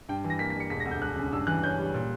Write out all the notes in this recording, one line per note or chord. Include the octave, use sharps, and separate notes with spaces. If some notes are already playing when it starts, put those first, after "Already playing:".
G2 G5
E3
A#6
A#3 B6
B6
G3
C#7
E1 B6
A#6
D2
G6
E1 F#6
C#3
G2 E6
E3 F#6
C#4 G6
G3
A#2